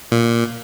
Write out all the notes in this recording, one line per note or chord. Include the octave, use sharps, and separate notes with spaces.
A#2